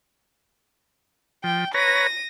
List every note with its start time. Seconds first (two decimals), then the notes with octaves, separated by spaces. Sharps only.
1.44 F3 G5
1.74 B4 C#5 A#5 A#6 D#7